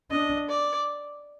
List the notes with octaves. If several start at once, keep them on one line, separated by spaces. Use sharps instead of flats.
D4 D#5
D5